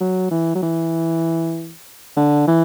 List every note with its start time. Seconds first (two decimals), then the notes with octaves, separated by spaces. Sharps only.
0.01 F#3
0.31 E3
0.55 F#3
0.63 E3
2.17 D3
2.47 E3